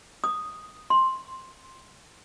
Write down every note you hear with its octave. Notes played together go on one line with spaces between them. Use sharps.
D#6
C6